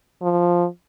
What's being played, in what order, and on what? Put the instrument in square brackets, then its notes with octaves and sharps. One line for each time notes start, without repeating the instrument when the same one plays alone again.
[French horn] F3